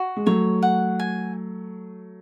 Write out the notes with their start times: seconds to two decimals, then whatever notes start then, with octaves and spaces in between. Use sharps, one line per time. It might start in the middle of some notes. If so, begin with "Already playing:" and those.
Already playing: F#4
0.16 G#3
0.26 F#3 A3 C#5
0.63 F#5
1.00 G#5